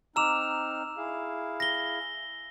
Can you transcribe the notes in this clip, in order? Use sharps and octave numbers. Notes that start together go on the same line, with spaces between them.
C4 D#4 A#5 D6 E6 F6 E7 F7
E4 G#4 F5
A#6 G7